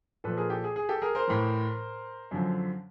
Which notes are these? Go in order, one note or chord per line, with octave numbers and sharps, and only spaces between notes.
A#2 F3 A4 B4
G#4 A#4
G4 A4
G#4
G#4
G4 A4
G#4 A#4
A#4 C5
A2 E3
F#2 D3 F3